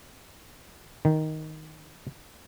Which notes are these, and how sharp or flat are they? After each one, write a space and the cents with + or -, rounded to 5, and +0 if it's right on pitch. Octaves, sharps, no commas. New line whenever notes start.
D#3 +5